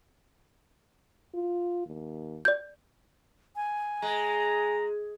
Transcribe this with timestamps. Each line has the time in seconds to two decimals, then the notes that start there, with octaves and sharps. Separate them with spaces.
1.34 F4
1.86 D#2
2.45 D5 G6
3.56 G#5
4.02 G#3 A#5